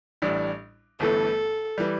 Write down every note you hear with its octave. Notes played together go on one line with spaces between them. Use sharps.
A1 A2 G3 D4
G1 G2 E3 A3 A4
E3 G3